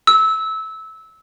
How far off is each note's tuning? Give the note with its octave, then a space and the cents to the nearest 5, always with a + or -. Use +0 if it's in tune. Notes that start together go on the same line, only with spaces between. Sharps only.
E6 -20